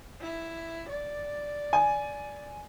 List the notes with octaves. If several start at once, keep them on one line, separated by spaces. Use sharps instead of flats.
E4
D5
G#5